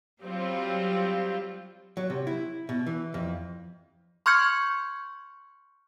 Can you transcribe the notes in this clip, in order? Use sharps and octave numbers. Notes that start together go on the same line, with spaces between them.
F#3 G3 C4 F4
F#3
C3
E4
B2
E3
F2
C6 C#6 F6 G6 G#6 C#7